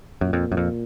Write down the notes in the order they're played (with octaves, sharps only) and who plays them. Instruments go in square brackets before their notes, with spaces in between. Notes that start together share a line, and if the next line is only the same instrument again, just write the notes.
[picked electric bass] F#2 [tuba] A#2
[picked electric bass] F2
F#2
F2